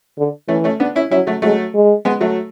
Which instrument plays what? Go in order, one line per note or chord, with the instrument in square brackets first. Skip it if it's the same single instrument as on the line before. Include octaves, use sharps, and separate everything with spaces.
[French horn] D3
[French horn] E3 [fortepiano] A3 C#4
[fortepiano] A3 C#4
B3 D4
C#4 E4
[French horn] F#3 [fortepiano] C#4 E4
[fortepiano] F#3 A3
[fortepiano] F#3 A3 [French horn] G#3
[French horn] G#3
[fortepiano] G#3 B3
F#3 A3